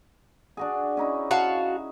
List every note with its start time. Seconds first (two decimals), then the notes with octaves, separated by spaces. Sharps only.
0.57 D4 F#4 G#4
0.97 C#4 D#4 E4
1.31 F#4 F5 A5